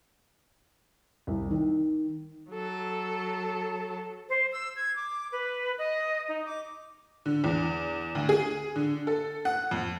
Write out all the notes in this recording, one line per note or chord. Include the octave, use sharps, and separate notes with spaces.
C2
D#3
F#3 A4
C5
E6
G#6
D6
B4
D#5
D#4
D6
D3
E2
D2
G#4
D3
A4
F#5
F2